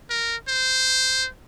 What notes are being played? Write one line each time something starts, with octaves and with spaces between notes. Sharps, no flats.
A#4
C5